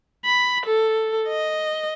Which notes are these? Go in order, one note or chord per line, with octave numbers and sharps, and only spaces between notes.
B5
A4
D#5